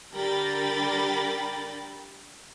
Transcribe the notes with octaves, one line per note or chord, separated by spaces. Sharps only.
D3 G3 A#4 G5 B5 A6